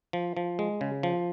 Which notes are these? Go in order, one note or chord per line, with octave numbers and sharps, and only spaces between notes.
F3
F3
G#3
C#3
F3